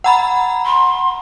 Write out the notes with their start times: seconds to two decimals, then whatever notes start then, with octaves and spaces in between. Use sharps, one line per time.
0.04 F#5 A#5 B5
0.65 C6